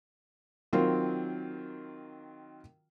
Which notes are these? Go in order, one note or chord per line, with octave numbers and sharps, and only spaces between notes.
D#3 F#3 C4 F4